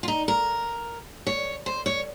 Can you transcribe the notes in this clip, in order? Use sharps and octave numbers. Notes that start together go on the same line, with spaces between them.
F4
D#4
A#4
C#5
C5
C#5